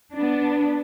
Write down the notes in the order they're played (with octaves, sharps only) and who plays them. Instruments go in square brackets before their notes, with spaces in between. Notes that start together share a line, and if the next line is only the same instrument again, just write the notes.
[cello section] B3 D4